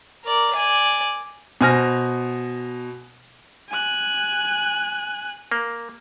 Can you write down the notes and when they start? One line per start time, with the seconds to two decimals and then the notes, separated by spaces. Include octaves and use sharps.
0.24 A#4 D5
0.54 D5 G#5
1.61 B2 C5 G#5 F6 A#6
3.69 G#5 F#6
5.52 A#3